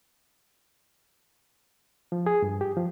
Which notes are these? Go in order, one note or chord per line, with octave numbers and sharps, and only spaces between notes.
F3
G#4
G2
G4
F3